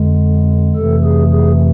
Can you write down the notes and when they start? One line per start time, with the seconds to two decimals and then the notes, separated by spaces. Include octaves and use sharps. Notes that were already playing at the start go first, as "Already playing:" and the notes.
Already playing: F2 D3 G#3
0.76 F2 C3 E3 A3 A4
1.04 G#4
1.32 G#4